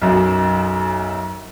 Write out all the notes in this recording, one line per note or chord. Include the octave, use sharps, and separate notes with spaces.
B1 F#2